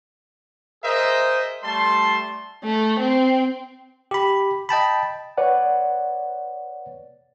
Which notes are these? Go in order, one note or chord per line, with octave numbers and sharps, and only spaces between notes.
G#4 A#4 C5 D#5 E5
G3 A3 A5 C6
A3
C4
G4 B5
D#5 G5 A5 B5
B4 C#5 D5 F#5